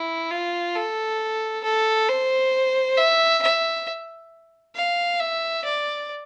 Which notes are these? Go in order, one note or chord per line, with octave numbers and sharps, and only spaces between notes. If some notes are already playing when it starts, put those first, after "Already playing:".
Already playing: E4
F4
A4
A4
C5
E5
E5
F5
E5
D5